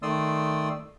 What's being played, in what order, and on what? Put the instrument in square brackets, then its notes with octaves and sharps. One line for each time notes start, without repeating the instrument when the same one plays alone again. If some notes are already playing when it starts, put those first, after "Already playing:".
[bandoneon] D#3 A3 D5 C6 D#6 E6